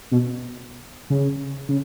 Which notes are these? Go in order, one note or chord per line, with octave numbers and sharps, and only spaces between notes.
B2
C#3
C#3